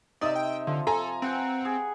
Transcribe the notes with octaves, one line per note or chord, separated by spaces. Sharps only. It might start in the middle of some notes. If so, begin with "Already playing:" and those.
C3 D#4 D5 E5 D#6
G5
D3 F3
A4 G#5 A#5
C4 B4 F#5 G5
G#4